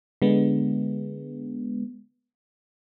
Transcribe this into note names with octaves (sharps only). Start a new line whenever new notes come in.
D3 G#3 B3